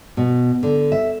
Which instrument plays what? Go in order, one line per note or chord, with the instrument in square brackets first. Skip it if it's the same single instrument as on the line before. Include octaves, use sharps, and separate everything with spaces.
[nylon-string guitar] B2
D3
E5